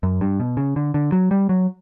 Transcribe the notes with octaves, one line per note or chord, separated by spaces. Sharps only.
F#2
G2
B2
C#3
D3
D3
F#3
G3
F#3